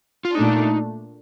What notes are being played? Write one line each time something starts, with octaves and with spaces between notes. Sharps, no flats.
F4
A#2 A3 D4 D#4